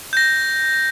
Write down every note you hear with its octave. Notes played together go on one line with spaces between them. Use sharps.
G6 A#6